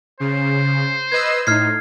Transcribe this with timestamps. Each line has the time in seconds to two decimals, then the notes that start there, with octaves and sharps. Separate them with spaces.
0.20 C#3 C5
1.12 B4 D#5 E6 G#6
1.47 A2 D#4 F6 G#6 C7